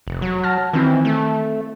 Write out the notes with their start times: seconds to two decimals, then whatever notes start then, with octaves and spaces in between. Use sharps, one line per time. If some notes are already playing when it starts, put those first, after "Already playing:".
0.07 F1
0.22 F#3
0.43 A5 F6 A#6
0.73 D#3 E3 C4 E4
1.05 A3